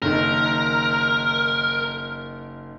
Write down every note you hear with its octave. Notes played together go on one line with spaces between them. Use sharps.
F#1 D#3 A#4